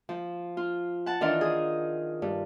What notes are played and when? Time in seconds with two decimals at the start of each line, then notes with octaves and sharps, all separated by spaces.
0.09 F3
0.57 F4
1.06 F#5 A5
1.21 D#3 E3 D4 D#4 F4 A#4
1.41 G#4 D#6
2.22 G2